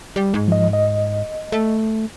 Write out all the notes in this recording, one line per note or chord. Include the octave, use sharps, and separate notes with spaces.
G3
G#2
F3 D#5
D#5
A3